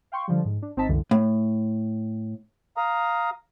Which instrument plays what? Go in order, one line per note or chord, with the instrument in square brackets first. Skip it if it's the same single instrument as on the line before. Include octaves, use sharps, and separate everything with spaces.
[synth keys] F5 G5 C6 C#6
D3 F3 G3
G#2
D4
G#1 C4 D#4 D#5 A5 B6
C2 F#2 D3 E3
[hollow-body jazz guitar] A2
[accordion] F5 A#5 D#6